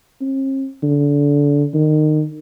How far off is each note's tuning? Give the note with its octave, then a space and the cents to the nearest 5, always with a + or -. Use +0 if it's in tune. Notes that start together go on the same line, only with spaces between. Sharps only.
C4 +45
D3 -25
D#3 -25